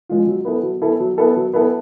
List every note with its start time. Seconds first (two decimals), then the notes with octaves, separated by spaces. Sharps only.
0.09 F3 G#3 C#4 F4
0.27 F#3
0.45 B3 E4 A4
0.63 F#3
0.82 B3 E4 A4
1.00 F#3
1.18 B3 E4 A4
1.36 F#3
1.54 B3 E4 A4